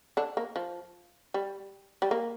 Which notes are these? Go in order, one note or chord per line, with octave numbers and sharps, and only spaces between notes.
D3 D4
A#3
F3
G3
G3
A#3